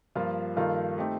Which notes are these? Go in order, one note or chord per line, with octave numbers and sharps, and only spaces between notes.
G2 F3 A#3 F4
G2 D#3 A#3 F4 A4
A3 C4 D#4 G4